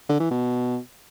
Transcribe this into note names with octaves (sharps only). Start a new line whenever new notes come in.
D3
E3
B2